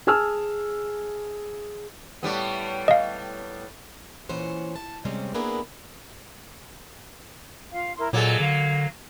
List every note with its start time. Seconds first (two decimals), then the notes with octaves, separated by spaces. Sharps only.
0.07 G#4 G#5 A5 E6 F6
2.23 A2 G3 B3
2.88 D#5 F5
4.29 A#2 E3 C#4 C5 F#5
4.76 A5
5.05 C3 G3 G#3 C4 C#4
5.34 A#3 B3 D4 E4 G#4 A#4
7.72 F4 F5
7.97 E4 A#4 C6
8.13 A#2 F#3 A#3 G#4 A4 D#5
8.40 D3 F5